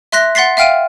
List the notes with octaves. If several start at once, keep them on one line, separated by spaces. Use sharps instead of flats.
E5 C6 F#6 A#6 B6
F#5 C6 A6 B6 C7
E5 F5 G5 F6 D7 D#7